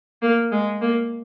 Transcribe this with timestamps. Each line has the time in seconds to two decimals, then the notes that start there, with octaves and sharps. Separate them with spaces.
0.22 A#3
0.52 G#3
0.82 A#3